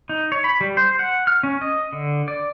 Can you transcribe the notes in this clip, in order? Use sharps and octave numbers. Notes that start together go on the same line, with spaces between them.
D#4
C#5
B5
G3
C5
F#5
F6
C#4
D#5
D3
D5